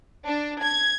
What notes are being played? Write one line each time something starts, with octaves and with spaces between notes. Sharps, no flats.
D4
G#6